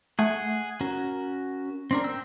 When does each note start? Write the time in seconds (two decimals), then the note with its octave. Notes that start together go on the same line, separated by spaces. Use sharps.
0.19 A3 G#4 F#5 G#5
0.81 C#4 F#4 A#4
1.91 C4 D4 A#4
2.04 G5 E6